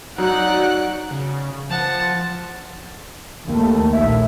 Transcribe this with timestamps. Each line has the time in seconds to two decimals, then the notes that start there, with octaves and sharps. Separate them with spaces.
0.18 F#3 D#4 D5 F#5 F#6
1.11 C#3
1.70 F3 F#5 A5
3.48 D#2 A3
3.92 A#1 A#2 E5